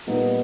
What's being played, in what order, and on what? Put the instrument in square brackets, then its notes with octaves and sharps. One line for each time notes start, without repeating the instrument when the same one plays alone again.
[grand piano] A#2 G3 B3 D#4